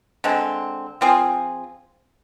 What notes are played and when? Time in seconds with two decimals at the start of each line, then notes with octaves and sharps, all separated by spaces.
0.24 D3 G#3 C4
1.01 F3 C4 F4 G#4